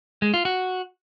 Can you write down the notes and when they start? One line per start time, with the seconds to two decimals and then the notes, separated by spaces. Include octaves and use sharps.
0.22 G#3
0.34 F4
0.45 F#4